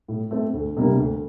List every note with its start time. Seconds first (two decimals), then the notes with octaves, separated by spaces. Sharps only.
0.08 A2
0.31 A3 C4
0.54 D2
0.77 C3 G3 A#3 D4
0.99 D2